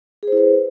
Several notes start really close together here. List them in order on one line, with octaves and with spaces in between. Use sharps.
G#4 C5 E4 B4